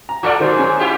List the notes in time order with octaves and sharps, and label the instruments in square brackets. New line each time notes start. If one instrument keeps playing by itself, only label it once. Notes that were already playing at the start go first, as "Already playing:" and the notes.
[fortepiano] A#5
[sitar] F4 A4 D5 [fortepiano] D6 F6
[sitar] G#2 [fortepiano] D#3 F#3 [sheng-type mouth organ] C5
[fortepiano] C#4 G#4
[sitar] E4 F4 G4